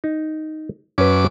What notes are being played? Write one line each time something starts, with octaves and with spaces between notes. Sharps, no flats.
D#4
F#2 C#4 B4 D6